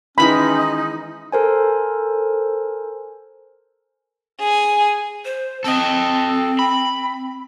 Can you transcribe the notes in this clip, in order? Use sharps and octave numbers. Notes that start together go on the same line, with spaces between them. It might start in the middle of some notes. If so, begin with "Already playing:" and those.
D#3 E3 G#3 C#4 D#4 B5
A4 A#4 C5 G#5
G#4 G#5
C5
C4 A4 D#5
B5